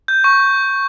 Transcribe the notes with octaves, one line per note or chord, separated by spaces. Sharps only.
G6
C#6